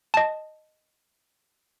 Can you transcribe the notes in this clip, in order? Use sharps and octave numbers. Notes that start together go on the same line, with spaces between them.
D#5 A5